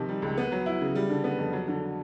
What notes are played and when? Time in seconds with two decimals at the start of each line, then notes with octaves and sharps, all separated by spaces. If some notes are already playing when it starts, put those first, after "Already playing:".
Already playing: C3 D#3 F3
0.09 G3
0.22 C#2
0.38 B3
0.52 F#3
0.66 E4
0.81 C#3
0.95 G3
1.10 D3
1.24 B3
1.39 F2
1.53 F#3
1.68 D3